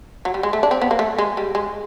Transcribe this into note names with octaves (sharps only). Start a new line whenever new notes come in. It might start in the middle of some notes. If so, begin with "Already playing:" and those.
F#3
G3
G#3
A3
D4
C4
B3
A#3
A3
G#3
G3
G#3